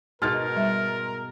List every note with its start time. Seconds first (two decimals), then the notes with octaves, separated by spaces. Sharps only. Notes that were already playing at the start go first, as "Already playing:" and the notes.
0.22 G#2 B2 A#4 C6 F6 A6
0.56 G3 E5